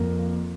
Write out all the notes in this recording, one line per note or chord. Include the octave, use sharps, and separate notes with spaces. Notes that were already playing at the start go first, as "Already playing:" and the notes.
Already playing: F2 A#3